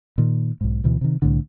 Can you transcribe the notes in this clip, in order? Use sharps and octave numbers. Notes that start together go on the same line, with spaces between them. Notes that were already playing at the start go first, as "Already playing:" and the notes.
A#2 D#3
B1 G#2
D2 B2 E3
C3 D#3
C2 A2 D3